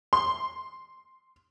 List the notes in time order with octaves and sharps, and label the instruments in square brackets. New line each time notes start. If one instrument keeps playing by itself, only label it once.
[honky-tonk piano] C6